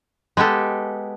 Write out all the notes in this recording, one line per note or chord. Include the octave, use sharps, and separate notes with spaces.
G#3 B3 G4 A4